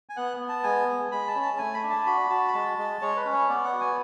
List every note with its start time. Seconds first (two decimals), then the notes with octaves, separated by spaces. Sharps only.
0.09 G#5
0.17 B3 F#5
0.40 B3
0.49 A5
0.63 G#3 G#5
0.88 G#3
1.12 G#3 B5
1.28 A5
1.35 C#4
1.42 A5
1.58 A3 G#5
1.74 B5
1.83 D4
1.90 A5
2.06 F#4 B5
2.30 F#4 A5
2.48 B5
2.53 G#3 A5
2.78 G#3
3.02 G#3 C#5
3.17 B4
3.25 C#4
3.33 C#5
3.49 B3 D5
3.64 F#5
3.73 F#4
3.80 G#5